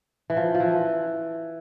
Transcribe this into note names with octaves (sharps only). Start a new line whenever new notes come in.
E3
F3
F3
E3